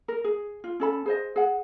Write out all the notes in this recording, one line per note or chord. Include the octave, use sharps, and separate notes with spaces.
A#4
G#4
F4
C#4 A4 B5
G#4 C5 D#5
G#4 F#5